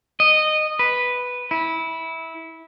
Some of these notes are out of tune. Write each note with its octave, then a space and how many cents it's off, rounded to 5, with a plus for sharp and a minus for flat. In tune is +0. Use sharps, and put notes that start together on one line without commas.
D#5 -15
B4 +0
E4 -15